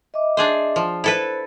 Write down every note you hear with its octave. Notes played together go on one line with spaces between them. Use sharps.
D#5 E5 D6
D4 G#4 C5
F3
E4 A4 B4 C5